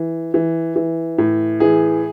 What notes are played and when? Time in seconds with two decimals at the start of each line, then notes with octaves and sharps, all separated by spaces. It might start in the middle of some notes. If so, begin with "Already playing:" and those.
Already playing: E3
0.34 E3
0.76 E3
1.18 A2
1.60 E3 G#4